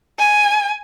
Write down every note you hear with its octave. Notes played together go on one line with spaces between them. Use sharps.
G#5